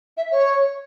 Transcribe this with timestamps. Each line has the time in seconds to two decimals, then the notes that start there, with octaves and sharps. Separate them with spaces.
0.17 E5
0.31 C#5